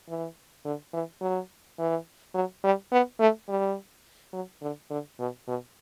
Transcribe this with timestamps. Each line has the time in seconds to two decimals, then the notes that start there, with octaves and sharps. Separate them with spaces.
0.09 E3
0.65 D3
0.94 E3
1.21 F#3
1.79 E3
2.35 F#3
2.64 G3
2.92 B3
3.20 A3
3.49 G3
4.33 F#3
4.62 D3
4.90 D3
5.19 B2
5.47 B2